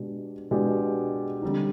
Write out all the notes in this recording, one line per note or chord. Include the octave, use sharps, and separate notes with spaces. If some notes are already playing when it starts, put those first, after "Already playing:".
Already playing: B2 G#3 D4 G4
B2 G#3 D4 G4
D3 G3 C4 D#4